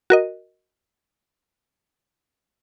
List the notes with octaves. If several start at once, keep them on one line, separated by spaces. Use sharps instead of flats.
F#4 A#4 D#5